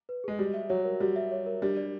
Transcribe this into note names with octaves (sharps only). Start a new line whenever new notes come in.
B4
G#3 G#4
G3 F#4
E5
F#3 C#5
A#4
G3 F#4
E5
C#5
A#4
G3 D4
D5